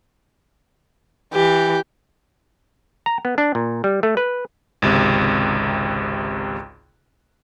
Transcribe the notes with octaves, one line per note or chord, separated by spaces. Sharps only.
E3 G4
A#5
B3
D4
A#2
G3
A3
B4
G#1 C#2 C3